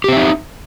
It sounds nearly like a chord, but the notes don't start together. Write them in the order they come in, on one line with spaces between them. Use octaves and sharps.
G4 C4 E5 D#4